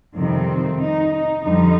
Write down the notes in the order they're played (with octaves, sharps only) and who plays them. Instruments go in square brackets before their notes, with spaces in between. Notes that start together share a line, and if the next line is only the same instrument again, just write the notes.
[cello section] F2 C3 D#3 G3 C4
D#4
D#4
F2 D3 G3 D#4